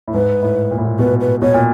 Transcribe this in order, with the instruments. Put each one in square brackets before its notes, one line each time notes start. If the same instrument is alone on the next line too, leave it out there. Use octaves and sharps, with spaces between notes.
[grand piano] A2
[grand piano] G#2 [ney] B4
[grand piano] A2
A#2
A2
A#2
[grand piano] B2 [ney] B4
[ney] B4
[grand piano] B2 [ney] C#5
[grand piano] A#2